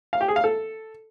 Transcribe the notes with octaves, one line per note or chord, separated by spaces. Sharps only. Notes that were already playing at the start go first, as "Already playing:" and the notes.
F5
G4
G#4
F5
A4